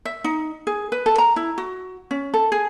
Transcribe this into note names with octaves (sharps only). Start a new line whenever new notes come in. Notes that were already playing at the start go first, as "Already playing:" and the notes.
E5
D#4
G#4
B4
A4
A#5
E4
F#4
C#4
A4
G#4